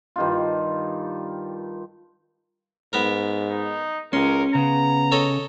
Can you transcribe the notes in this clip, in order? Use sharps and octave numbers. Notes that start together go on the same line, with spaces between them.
G2 D#3 F4
G#2 B3 A#4
D#4
C#2 C#4 A#4 C6
C#3 B3 A#5
A4 C#5 D#5